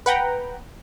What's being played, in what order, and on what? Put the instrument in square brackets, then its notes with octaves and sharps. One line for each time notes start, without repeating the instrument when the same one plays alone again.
[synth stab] B4 F#5 G5 A#5